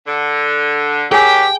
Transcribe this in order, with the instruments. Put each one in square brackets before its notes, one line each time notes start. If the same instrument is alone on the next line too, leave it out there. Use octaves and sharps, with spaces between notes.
[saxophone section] D3
[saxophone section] D#3 F#3 [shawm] G4 [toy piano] G#4 G#5 [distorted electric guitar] G5